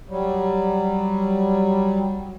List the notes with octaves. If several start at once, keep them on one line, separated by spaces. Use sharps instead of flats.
F#3 G3